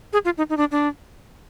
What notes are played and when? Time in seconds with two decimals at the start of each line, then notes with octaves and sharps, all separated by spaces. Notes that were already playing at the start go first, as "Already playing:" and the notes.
0.13 G#4
0.25 F4
0.38 D#4
0.50 D#4
0.57 D4
0.71 D4